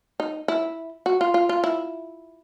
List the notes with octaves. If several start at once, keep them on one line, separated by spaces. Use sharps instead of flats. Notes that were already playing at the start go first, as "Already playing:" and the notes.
D#4
E4
F#4
F4
F4
F4
E4